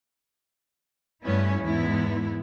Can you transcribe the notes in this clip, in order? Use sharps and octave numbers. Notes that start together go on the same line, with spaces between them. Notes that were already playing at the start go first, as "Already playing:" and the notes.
G2 G3 A3 B3 C#4 E4
E2 G#2 G#3 B3 E4